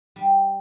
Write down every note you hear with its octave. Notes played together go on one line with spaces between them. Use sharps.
G3